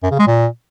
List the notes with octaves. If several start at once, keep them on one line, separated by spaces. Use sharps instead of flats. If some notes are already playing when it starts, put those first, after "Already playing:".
F#2
C#3
G#3
A#2